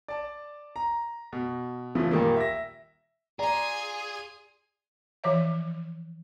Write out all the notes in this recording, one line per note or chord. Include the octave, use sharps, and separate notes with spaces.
D5 A5
A#5
B2
C#3 E3 F3 A3
A#2 D#3 G3 A#3
E5 A#6
F4 G#4 D5 G#5 A#5
E3 F3 C#5 E5